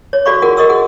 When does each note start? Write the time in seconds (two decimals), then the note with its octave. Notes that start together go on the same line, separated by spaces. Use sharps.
0.13 C#5
0.26 F#4 A4 D5 F5 B5 C#6
0.42 F4 F#4 G#4 A#4 F#5
0.57 A#4 D#5 C#6 D#6 E6
0.69 F#4 G#4 F#5